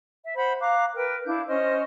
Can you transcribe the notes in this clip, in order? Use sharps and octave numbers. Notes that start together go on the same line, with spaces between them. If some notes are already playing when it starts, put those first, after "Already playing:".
E5
C5 F#5 B5
F5 A#5 D6 F#6
A#4 B4 G5
D4 E4 F5 G6
C#4 C5 D#5 F6